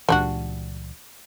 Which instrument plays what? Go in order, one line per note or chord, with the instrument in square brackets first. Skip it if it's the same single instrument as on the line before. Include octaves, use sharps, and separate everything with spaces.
[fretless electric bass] C#2 A#2 E3 [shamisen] G3 D4 F#4